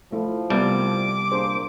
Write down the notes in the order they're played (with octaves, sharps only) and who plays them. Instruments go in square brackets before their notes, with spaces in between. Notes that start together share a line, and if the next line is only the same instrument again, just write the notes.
[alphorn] F3 [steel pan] A3 E4
[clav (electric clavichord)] C2 G3 [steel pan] B3 A5 [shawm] D6
[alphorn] A#3 [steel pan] D4 G#4 C5